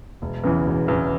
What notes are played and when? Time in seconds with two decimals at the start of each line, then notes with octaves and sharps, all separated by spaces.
0.22 E1
0.44 E2 C#3 E3
0.66 E1
0.88 E2 C#3 E3